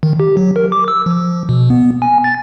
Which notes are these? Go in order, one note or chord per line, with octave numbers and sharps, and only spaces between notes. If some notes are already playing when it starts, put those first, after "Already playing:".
D#3
G4
F#3
A#4
D6
E6
F3
B2
B3
G#5
A6